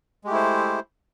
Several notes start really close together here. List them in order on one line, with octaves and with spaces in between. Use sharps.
G#3 G4 A3 E4 C5